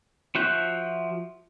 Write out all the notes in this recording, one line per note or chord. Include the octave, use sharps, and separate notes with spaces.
F3 F#4 E5 F#6 G6